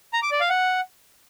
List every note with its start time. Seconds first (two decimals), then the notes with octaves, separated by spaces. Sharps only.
0.13 A#5
0.22 D6
0.31 D5
0.40 F5
0.49 F#5